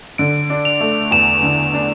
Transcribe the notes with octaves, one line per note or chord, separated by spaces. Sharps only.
D3 D7
D4
F7
A3
E2 E7
D3
D4